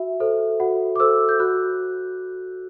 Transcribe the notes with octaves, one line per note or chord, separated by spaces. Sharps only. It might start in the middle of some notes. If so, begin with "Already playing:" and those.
Already playing: F#4 E5
A4 C5
F#4 F#5
D6
A4 C5 E6
G6
F#4 F#6